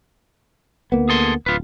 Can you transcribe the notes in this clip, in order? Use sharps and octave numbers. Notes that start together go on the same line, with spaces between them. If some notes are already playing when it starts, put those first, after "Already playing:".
D2 A#3 B3
G#4 A4 C6
D1 F4 B4